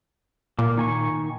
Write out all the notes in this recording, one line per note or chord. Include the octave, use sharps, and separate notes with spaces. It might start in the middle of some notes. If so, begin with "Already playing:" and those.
A#2 A#3
D#3 G#5 C#6